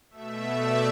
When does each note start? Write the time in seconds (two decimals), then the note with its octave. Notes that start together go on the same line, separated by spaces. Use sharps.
0.11 B2 A3 E5
0.58 D5